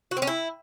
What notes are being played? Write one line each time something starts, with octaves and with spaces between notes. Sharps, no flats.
F#4
C4
C#4
E4